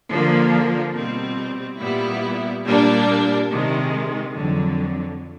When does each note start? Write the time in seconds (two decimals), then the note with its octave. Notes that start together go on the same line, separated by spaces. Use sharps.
0.11 D3 F3 A#3
0.95 B2 G3 C4
1.80 A#2 G3 B3 E4
2.66 A#2 G3 A#3 D4
3.50 C3 D#3 G#3
4.35 F2 D3 F#3